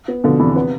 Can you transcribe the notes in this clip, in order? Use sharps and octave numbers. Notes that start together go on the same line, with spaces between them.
B3
B2 D3 F3
E2 C3 E3
C3 B3